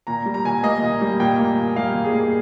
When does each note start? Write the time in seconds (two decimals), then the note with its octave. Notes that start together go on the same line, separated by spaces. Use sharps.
0.07 A#2 A#5
0.26 G3
0.34 A#5
0.45 A#2 G#5
0.63 A#3 D#5
0.82 A#2
1.01 G3
1.20 A#2 G5
1.39 A#3
1.58 A#2
1.76 G3 F5
1.95 A#2
2.04 G#4
2.14 A#3